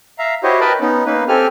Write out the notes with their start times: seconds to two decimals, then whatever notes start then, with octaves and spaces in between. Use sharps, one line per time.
0.19 E5 F5 A#5
0.43 E4 F#4 G4 C5 C#5 D#5
0.60 A#4 B4 D#5 G5 A5 B5
0.81 B3 C#4 D#4
1.05 A#3 C#4 D#4 B4
1.28 C4 G4 A4 G#5 F6